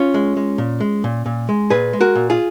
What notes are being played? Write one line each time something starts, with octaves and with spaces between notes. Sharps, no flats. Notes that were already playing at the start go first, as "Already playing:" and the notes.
Already playing: C#4 F4
G#3
G#3
A#2
G#3
A#2
A#2
G#3
A#2 G#4 B4
G#3
F#4 A#4
A#2
F4 G#4